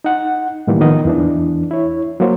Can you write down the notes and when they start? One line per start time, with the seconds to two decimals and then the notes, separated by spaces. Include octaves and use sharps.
0.04 D#4 F#5
0.67 A2 D#3 E3 G3 A#3
0.81 D#3 F3 B3 D#5
1.05 E2 E3 D4
1.71 E4 C#5
2.20 F#3 A#3 C5 C#5